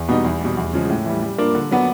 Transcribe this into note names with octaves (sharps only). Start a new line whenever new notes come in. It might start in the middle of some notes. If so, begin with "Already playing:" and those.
Already playing: E2
B2 G3 B3 D#4
E2
B2 G3
E2
C#3 F3 G#3
A2
E3 G3
G3
A#3 D4 F4 A#4
D3
F#3 B3 D4